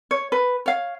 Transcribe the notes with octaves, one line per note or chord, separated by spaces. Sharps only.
C#5
B4
C#5 F5